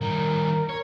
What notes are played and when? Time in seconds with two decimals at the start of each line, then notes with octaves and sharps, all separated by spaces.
0.01 D#3 G3 A#4
0.69 C#5